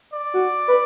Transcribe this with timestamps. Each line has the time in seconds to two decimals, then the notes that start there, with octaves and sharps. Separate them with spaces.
0.13 D5
0.34 F#4
0.68 B4